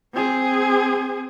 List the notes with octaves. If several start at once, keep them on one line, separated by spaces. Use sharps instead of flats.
C4 G#4